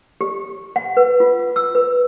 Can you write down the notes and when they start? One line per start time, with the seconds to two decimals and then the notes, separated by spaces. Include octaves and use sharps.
0.21 G4
0.76 F#5
0.97 B4
1.20 F4
1.56 E6
1.75 B4